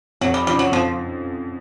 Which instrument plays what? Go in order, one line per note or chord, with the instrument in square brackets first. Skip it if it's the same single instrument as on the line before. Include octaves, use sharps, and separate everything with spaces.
[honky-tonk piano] F2 [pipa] F#3
[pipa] G3
[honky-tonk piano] C#3 F3 [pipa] G3
[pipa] F#3
[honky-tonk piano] F2 [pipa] F3